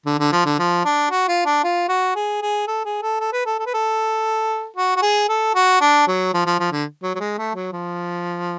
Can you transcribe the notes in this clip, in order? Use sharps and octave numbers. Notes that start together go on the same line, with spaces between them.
D3
D3
F3
D3
F3
D4
F#4
F4
D4
F4
F#4
G#4
G#4
A4
G#4
A4
A4
B4
A4
A4
B4
A4
F#4
F#4
G#4
A4
F#4
D4
F#3
F3
F3
F3
D3
F#3
F#3
G#3
A3
F#3
F3